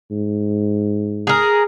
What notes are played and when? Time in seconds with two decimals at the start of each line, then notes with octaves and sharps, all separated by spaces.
0.11 G#2
1.27 G#4 A#4